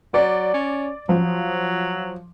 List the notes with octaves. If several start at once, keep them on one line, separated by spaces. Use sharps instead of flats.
F#3 D5
C#4
F3 F#3